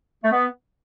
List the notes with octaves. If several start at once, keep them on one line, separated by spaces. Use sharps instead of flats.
A3
B3